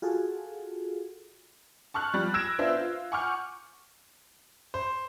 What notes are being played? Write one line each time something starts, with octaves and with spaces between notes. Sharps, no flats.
F4 F#4 G#4 A4
A5 C#6 F6 F#6
F3 G3
E6 G#6 A#6 D7 E7
B3 D4 F4 C5 E5
F4
F#5 G#5 C#6 D6 F6 G6
C5